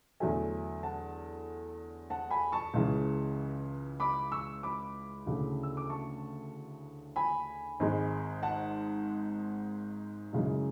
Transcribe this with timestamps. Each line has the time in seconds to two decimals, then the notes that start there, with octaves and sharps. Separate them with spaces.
0.20 E2 D3 F#3 A3 E5 G#5
0.83 F#5 A5
2.10 F#5 A5
2.31 G#5 B5
2.52 A5 C#6
2.74 C#2 C#3 E3
4.00 B5 D6
4.32 C#6 E6
4.63 B5 D6
5.26 D2 C#3 E3
5.63 E6
5.77 D6
5.90 A5 C#6
7.16 G#5 B5
7.80 G#1 G#2 G#3
8.43 F#5 A5
10.33 F#2 C#3 E3 G#3